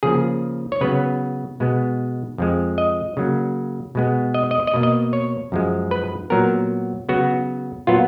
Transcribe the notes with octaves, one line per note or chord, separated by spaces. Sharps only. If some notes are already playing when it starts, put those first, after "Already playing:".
C#3 F3 A#3 G#4
C#5
C#3 F#3 B3 B4
B2 G#3 B3
F2 F3 G#3
D#5
C#3 F#3 A#3
B2 G#3 B3
D#5
D#5
D#5
B2 A#3
D#5
C#5
F#2 F3 G#3
B4
A#2 F#3 B3 A#4
C#3 F#3 B3 F#4
A#2 F#3 B3 F4